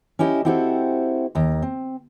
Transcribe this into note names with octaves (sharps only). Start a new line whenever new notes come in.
C#4 E4 G4 D#5
C4 E4 F#4 G4 A4 C5
D#2 A#5
C4